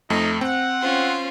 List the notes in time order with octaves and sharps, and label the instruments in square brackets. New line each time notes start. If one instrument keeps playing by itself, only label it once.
[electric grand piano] F2 A3 [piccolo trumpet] D#4
[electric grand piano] C4 [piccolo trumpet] F#5
[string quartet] C#4 F4 C5